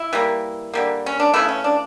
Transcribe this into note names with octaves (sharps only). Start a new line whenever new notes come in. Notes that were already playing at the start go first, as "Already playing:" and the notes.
Already playing: E4
E3 G3 A#3
D3 G3 A#3
C#4
D4
C#3 E3 A3 E4
C#4
D4